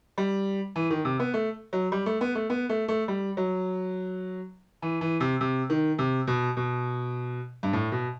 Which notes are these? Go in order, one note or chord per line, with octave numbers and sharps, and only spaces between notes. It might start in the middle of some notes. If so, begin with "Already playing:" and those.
G3
E3
D#3
C3
B3
A3
F#3
G3
A3
B3
A3
B3
A3
A3
G3
F#3
E3
E3
C3
C3
D#3
C3
B2
B2
G2
A2
B2